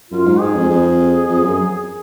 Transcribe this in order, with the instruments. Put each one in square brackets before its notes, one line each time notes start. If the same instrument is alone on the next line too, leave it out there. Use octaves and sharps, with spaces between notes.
[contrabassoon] F#2 [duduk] F4
[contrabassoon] G#2
[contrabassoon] G#2 [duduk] G#4
[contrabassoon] F2
[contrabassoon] F2 [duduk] G#4
[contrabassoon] F2
F#2